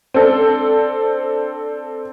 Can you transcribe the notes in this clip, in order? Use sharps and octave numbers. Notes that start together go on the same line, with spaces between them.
C4 D4 A4